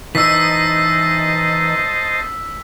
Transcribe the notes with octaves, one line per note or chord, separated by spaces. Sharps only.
E3 D#4 C5 D#5 A5 E6 B6